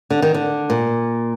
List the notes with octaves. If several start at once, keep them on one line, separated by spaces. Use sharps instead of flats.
D3
D#3
D3
A#2